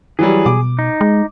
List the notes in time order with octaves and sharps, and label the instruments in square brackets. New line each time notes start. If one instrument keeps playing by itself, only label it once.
[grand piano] E3 F#3 G3 [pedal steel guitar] G#4
[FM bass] B2 [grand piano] D6
[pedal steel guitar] D#4
[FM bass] G#3